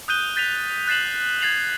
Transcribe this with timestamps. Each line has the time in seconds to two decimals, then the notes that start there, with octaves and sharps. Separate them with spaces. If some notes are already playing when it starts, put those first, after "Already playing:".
0.08 D#6 F#6 G6 D#7 G7
0.36 G6 A6 B6 D#7 F7
0.87 F#6 A6 C7 E7 F#7
1.41 G#6 A6 C7 F7 F#7